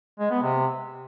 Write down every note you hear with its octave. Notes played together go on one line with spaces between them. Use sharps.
G#3
B3
C3